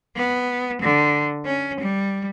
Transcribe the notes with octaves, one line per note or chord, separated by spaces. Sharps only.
B3
D3
C#4
G3